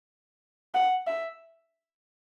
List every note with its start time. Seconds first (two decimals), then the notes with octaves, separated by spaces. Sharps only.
0.74 F#5
1.07 E5